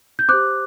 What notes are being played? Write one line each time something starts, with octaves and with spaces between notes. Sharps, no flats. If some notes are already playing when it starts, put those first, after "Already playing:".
G6
G4 C5 D6 F#6